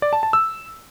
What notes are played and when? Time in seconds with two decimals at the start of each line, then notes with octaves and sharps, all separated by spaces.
0.02 D5
0.13 A5
0.23 A5
0.33 E6